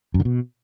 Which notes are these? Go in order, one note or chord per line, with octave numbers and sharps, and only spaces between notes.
F#2
D3
B2